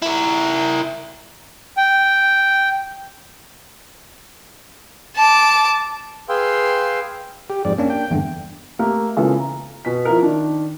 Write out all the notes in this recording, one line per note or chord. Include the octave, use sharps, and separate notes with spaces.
E4 A#4
G5
A5 D6
G#4 B4 F5 G5 C6 E6
G4
F2 G#2 D5
A#3 C#4 D4
G5
E2 G2 D3
A3 A#3 G4 A#4
A#2 C#3 E3 G#3 B3 A4
A#5
B2 B6
F3 E4 A#4
D#3 D4